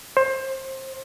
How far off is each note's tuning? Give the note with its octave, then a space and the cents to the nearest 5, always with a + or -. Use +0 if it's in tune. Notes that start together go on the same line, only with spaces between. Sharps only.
C5 +25